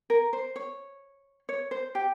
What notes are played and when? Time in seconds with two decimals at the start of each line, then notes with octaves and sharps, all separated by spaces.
0.10 A#4
0.33 C5
0.56 C#5
1.49 C#5
1.71 C5
1.95 G4